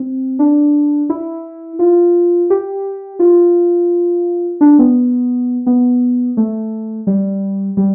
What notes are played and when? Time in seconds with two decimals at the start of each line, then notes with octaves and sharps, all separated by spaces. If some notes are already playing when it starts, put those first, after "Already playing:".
Already playing: C4
0.39 D4
1.10 E4
1.79 F4
2.50 G4
3.19 F4
4.61 D4
4.79 B3
5.67 B3
6.37 A3
7.07 G3
7.77 G3